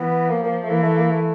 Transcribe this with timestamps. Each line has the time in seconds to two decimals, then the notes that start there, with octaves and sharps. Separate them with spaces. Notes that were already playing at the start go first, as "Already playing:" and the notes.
Already playing: E3 B3
0.30 F3 A#3
0.44 A#3
0.63 A3
0.70 E3 A#3
0.83 A3
0.98 A#3
1.10 A3